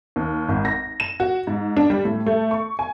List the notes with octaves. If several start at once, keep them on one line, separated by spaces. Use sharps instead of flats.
D#2
G#1
A#6
E7
F#4
G#2
D4
G3
A2
A3
C#6
G#5